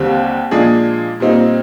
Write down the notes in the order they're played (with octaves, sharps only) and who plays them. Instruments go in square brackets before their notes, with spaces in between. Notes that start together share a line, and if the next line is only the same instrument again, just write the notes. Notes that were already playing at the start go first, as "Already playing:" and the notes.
Already playing: [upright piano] D#2 D3 G3 C4 G4
A#2 F3 G#3 D4 G#4
A#2 G3 C4 D#4